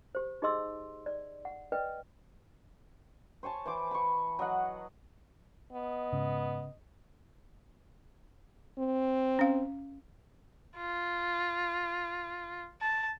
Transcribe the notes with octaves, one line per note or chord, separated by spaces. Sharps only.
G4 C5
D#4 G4 G#4 D#5 C6 E6
D5
F#5
B4 D5 D#5 G5
C5 C#5 G#5 A5
E3 C5 D6
B5 C#6
F#3 D#5 F#5
B3 D#5
G#2 C#3
C4
C#4 F5
F4
A5